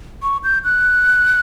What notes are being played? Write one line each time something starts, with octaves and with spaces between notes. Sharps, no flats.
C#6
G6
F#6